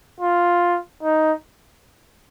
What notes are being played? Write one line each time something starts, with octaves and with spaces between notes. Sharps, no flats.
F4
D#4